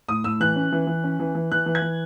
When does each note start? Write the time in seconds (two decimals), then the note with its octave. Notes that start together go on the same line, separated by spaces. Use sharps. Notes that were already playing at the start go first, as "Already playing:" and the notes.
0.09 A2 D#6
0.24 A2 E6
0.40 E3 F#6
0.56 C#4
0.72 E3
0.87 E3
1.04 C#4
1.20 E3
1.35 E3
1.52 E3 F#6
1.66 E3
1.75 G#6
1.82 E3